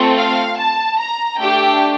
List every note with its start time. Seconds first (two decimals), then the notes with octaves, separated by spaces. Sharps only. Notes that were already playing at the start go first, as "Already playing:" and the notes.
Already playing: A3 C4 F4 A4
0.17 F5
0.58 A5
0.99 A#5
1.40 A3 D4 G4 G5